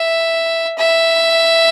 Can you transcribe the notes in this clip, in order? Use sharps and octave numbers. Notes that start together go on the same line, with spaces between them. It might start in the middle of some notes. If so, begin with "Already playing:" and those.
Already playing: E5
E5